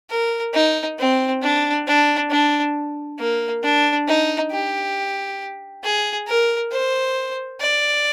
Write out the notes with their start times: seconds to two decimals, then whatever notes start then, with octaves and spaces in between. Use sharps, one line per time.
0.10 A#4
0.54 D#4
0.99 C4
1.42 D4
1.87 D4
2.30 D4
3.19 A#3
3.63 D4
4.08 D#4
4.51 G4
5.84 G#4
6.28 A#4
6.72 C5
7.61 D5